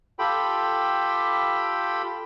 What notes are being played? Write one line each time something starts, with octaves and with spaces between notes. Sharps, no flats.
F4 G4 A4 G5 B5